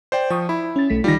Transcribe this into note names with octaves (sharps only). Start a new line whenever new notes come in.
C5 D5 G5
F3 G5 C#6 D#6
E4 B5
C#4 A6
B1 A3 B6
D#3 G3 D#4 F4 A#6